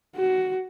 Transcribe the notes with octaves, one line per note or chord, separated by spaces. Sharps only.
F#4